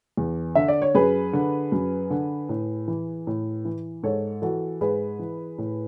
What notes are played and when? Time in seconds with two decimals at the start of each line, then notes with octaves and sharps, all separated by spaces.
0.17 E2
0.55 D3 E5
0.68 D5
0.82 C#5
0.95 F#2 G#4 B4
1.33 D3
1.72 F#2
2.10 D3
2.49 A2
2.88 E3
3.27 A2
3.65 E3
4.03 G#2 A4 C#5
4.42 E3 F#4 A4
4.81 G#2 G#4 B4
5.19 E3
5.58 A2